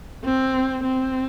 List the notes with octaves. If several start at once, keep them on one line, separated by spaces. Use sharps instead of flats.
C4
C4